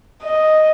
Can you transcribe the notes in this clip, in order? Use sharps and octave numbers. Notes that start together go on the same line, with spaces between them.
D#5